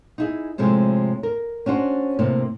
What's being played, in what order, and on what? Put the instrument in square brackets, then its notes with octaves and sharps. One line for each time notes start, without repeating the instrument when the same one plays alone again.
[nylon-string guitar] D#4 E4 G#4
A2 C3 F3 G#3 A3
A#4
C#4 D4 F#4 C5
A2 C3 A#3